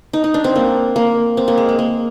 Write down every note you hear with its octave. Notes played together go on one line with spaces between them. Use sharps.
D#4
D#4
D4
C4
A#3
A#3
C4
A#3
G#3
G#3
A#3